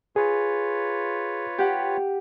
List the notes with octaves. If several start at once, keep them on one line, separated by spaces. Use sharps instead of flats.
F4 G#4 B4 C#5
G4 F#5